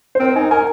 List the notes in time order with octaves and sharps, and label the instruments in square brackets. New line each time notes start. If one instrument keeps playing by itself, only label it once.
[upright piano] C5
[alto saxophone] C4 [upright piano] A#4
[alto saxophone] D#4 [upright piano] G#5
[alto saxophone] A#4 [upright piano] G#5